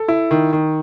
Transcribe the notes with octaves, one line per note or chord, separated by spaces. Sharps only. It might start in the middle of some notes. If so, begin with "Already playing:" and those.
Already playing: A4
E4
D#3
D#3